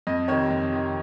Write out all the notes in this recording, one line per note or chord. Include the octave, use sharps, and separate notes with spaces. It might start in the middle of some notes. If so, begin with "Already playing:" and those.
F2 D#5
C3 D#3 C#5
F2
C3 D#3